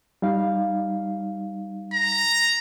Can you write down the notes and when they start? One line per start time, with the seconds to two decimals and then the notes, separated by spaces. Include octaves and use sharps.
0.22 G3 D#4 F5
1.93 A#5